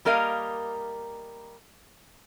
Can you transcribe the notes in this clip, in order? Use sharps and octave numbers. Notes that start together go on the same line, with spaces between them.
G3 A#3 A#4 D#5 F5